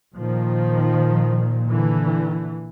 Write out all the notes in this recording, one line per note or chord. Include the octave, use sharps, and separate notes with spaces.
A#2 D#3 F3
D3 E3